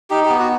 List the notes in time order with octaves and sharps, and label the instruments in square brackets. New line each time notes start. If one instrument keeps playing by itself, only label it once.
[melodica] D#4 G4
B3 G4
F#4